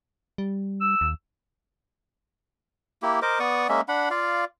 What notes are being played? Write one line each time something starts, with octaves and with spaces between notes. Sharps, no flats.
G3
E6
D#2
A#3 E4 G4
A#4 C5 D#5 D6
B3 D5 C#6 D#6
G#3 A#3 C#4 E5
D4 F#5 B5
F4 D5 F5